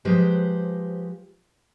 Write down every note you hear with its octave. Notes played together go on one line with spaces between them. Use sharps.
F3 G#3 G4 B4 C5